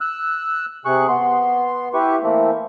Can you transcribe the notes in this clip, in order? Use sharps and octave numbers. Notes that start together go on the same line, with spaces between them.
E6 F#6
C3 G#4 C#6 F#6
B3 C6
E4 G4 B4 C#6
E3 A3 A#3 C4